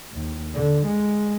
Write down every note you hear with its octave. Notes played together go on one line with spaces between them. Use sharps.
D#2
D3
G#3